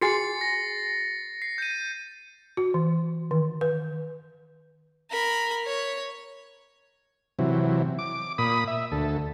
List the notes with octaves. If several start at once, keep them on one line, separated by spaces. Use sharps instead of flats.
F#4 G#4 G#5 A6 C7 C#7
A#6
C7
G6 D#7
F#4
E3
D#3
B4
A#4 B5
C#5
C3 E3 F#3
D6
A#2 B5 D#6
E5
D2 A4